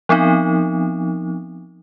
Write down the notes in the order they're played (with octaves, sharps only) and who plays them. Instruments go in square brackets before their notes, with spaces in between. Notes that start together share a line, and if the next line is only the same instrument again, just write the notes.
[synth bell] F3 B3 C4 D#4